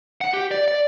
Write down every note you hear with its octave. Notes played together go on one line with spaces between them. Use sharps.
F#5
G4
D5
D5